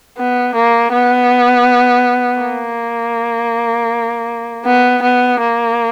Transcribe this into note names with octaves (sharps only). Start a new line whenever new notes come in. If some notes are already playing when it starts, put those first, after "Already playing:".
B3
A#3
B3
A#3
B3
B3
A#3